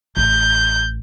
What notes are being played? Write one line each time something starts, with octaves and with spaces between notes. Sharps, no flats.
A1 G6